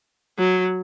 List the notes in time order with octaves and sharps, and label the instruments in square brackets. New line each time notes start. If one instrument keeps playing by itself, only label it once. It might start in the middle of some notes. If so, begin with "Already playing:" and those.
[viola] F#3